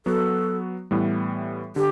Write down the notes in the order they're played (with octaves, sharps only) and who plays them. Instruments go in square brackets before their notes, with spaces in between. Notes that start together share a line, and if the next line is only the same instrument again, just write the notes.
[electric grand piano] F#3 B3 F#4 [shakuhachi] A4
[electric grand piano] A2 E3 G3 B3
[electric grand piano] D3 [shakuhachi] G4